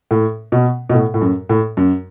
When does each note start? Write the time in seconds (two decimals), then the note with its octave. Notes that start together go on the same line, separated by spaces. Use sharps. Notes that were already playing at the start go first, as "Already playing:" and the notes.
0.11 A2
0.52 B2
0.89 B2
0.94 A2
1.14 A2
1.21 F#2
1.49 A2
1.77 F#2